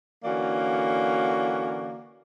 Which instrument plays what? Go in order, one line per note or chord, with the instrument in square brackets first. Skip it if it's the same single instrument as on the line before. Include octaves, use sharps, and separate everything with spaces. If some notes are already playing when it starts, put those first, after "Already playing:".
[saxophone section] D3 E3 A#3 C#4 F#4 D5